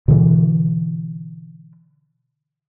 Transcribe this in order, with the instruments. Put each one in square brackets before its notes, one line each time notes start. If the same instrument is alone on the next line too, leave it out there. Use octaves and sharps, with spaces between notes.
[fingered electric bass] B2 D3 E3